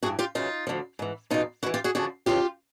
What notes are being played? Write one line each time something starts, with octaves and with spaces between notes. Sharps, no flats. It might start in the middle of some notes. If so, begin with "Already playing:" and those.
G2 E3 F#4 G#4
F4 G4
F#2 C#3 E3 D#4 F4
D2 D3 F3
G#2 E3
E2 B2 D#4 F4
G#2 E3 E4 F#4
F4 G4
F#4 G#4
F#2 D3 F3 F#4 G#4
F2 C#3 E3 F4 G4